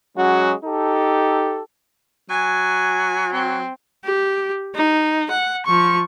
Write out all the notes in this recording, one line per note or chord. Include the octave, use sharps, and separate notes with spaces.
F#3 G#3 C#4 F#4
D#4 G4 A4
F#3 G#5
C4
G4
D#4
F#5
F3 C#6